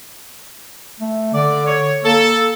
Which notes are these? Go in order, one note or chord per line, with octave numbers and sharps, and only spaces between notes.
A3
D3 D5
C#5
A#3 A4